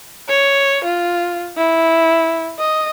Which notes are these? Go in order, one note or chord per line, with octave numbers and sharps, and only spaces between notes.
C#5
F4
E4
D#5